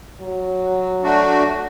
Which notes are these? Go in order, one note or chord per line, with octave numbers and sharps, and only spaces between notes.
F#3
A3 D4 F#4